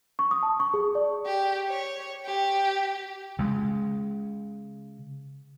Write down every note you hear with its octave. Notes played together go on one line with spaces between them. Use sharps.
C#6
D#6
A5
C#6
G#4
D5
G4
C#5
G4
C#3 G#3